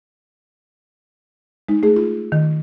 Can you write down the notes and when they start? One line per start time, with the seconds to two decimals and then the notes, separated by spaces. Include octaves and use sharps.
1.69 G#3 D#4
1.83 A3 G#4
1.96 F4
2.32 D#3